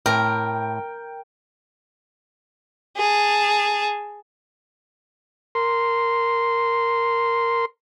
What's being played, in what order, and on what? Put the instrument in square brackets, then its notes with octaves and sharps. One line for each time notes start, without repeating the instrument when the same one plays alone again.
[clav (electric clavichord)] A2 [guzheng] A#4 [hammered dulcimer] G5
[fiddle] G#4 A5
[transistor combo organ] A#4 C6